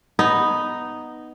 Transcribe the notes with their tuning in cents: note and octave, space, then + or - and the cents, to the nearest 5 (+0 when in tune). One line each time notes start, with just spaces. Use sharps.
B3 +0 D#4 -5